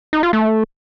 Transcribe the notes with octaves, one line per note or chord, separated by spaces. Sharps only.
D#4
F4
A3